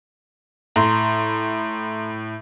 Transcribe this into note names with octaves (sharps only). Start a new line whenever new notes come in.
A2 A#5 C6